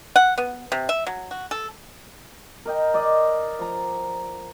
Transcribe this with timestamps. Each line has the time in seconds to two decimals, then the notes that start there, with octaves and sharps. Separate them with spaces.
0.16 F#5
0.38 B3
0.72 C3
0.89 E5
1.07 F#3
1.31 F#4
1.51 A4
2.66 A#4 D#5 G5
2.94 D5 D#5
3.59 F3 A#5